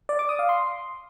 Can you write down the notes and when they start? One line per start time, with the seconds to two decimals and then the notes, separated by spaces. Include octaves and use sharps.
0.09 D5
0.19 D6
0.29 D#6
0.39 F5
0.49 C6